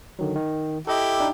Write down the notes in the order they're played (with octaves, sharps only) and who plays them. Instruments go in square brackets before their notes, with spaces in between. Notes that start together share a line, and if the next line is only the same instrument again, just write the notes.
[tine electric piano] D3 D#3 F#3
D#3
[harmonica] E4 G4 [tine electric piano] A4 D#5
[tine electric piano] D4 D#4